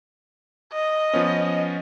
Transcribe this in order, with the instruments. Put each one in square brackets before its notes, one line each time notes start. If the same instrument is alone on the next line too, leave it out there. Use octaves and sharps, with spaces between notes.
[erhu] D#5
[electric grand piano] F3 B3 C#4